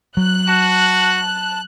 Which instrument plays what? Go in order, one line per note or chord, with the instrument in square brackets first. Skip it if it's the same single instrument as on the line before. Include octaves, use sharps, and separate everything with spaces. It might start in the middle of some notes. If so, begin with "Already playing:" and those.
[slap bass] F#3 [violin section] F#6
[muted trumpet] F#4 [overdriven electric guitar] A5